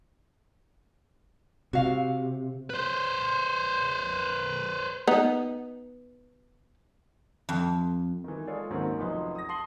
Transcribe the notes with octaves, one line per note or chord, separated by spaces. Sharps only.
C3 F#4 F5
B4 C5
B3 D#4
F2
D#3 E3
G#3 F4 G#4 A4 C#5 D5
D#2 G#2 D#3 F#3 C4 C#4
F1 F#2 F3 D#4 B4 C6
D#6 A#6
A5 C6 D#6 C7 F#7 G7